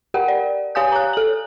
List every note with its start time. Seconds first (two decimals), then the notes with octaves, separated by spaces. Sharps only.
0.14 G4 A#4 F#5 G5
0.28 D5
0.75 G4 C#5 F5 G#5 D#6 G6
0.92 A#5 F#6
1.13 A4 F#7